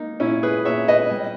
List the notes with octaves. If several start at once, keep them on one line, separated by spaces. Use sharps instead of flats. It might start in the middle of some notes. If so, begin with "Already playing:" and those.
Already playing: A#3 D#4
A#2 C#4 E4
G#4 B4
A#2 C#5 E5
B4 D#5
G3